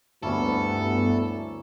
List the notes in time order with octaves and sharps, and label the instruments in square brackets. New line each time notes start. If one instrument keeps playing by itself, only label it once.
[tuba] D2 [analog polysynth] G2 B3 [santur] A#3 C#4 E4 [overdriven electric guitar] A4